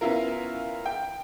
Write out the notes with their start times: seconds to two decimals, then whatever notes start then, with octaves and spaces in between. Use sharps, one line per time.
0.01 B3 C#4 E4 F4 A#4
0.86 G5